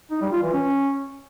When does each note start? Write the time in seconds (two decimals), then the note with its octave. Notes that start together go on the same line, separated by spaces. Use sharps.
0.11 D#4
0.22 G3
0.32 F4
0.43 E3
0.53 C#4